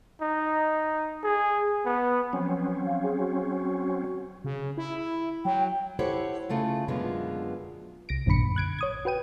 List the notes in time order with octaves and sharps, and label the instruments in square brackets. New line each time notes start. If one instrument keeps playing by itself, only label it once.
[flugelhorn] D#4
G#4
B3
[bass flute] F3 [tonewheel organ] F#3 C4 C#4
[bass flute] F5
G#4
F#4
[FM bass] C#3
E4
[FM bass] F#3 [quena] G5
[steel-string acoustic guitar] E4 G4 A4 C5 C#5 F#5
C#3 A3 E4 F4
F#2 B2 D3 G#3 B3 F4
[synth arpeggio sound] C2 A#6 D7
A1 F#2 A#2 D3 B5 C#7
F#6 G#6 D7
C#5 D#6 G#6
F#4 B4 G5 D#7